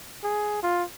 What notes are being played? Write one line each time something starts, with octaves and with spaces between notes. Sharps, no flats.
G#4
F4